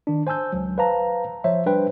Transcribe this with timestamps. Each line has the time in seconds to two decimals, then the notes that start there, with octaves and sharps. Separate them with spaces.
0.07 D#3 D4
0.27 C5 G#5 A5 E6 G6
0.53 C#2 F#3
0.78 B4 C5 F5 A5 A#5
1.44 F3 C5 C#5 E5
1.66 G3 D4 B4 C5 G5